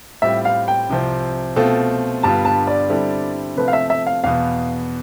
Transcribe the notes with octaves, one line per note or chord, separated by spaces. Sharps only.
A2 G3 C4 F4 E5
F5
G5
C2 C3 F3 C4
B2 A3 C4 F4 A4
G2 D3 G3 B3 F4 A5
A5
D5
D3 G3 C4 E4 A4
C3 F3 A3 C4 B4
F5
E5
E5
F5
E2 B2 B3 F5